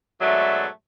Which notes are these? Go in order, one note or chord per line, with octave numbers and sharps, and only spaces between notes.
G#2 B2 F#3 A3 D5 E5